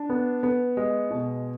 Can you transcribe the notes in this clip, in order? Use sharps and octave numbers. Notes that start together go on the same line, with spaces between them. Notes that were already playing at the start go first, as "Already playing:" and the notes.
Already playing: D4
B3
B3
G#3
B2